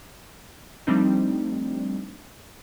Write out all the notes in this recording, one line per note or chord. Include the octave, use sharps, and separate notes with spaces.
F3 G3 A3 C4 D4 D#4